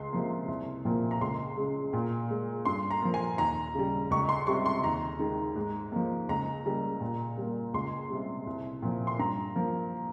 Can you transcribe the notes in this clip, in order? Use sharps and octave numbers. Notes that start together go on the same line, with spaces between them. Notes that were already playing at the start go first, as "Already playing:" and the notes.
Already playing: C#2 C6
C3 F3 A#3
C2
A#2 F3 A#3
A#5
C#2 C6
C#3 G#3
A#2
G#3
G2 C6
A#5
F3 A#3
G#5
D#2 A#5
C#3 G3
C#2 C#6
C6
C3 G3 C#6
C6
D#2 A#5
D#3 G#3
G#2
F3 A#3
C#2 A#5
C#3 G3 A#3
A#2
G3 A#3
C#2 C6
C3 G3
C2
A#2 F3 A#3
C6
G2 A#5
F3 A#3